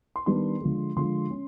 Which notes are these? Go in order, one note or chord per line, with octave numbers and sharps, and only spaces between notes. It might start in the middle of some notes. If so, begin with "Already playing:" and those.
C6
D#3 G3 B3 D4 C6
D3 F3 G#3
D3 F3 G#3 C6
C#4